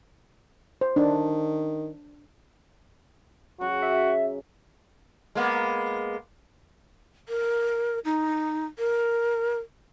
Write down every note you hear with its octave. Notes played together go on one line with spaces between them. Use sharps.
C5
D#3 D4
C#3 F#3 F#4
E5
G#3 A#3 B3
A#4
D#4
A#4